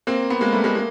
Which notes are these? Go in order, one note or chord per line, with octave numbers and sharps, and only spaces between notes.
A#3 C4
B3
G#3 A#3
G3 A3
G#3 A#3
A#3